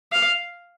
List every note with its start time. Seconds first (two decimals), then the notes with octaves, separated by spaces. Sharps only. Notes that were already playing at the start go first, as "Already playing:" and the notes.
0.12 F5